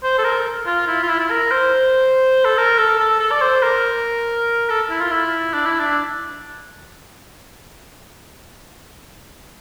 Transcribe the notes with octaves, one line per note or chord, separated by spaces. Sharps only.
C5
A4
A#4
F4
E4
F4
E4
E4
A#4
C5
A4
A#4
A4
A4
A4
D5
C5
A#4
A4
E4
F4
E4
D4
E4
D4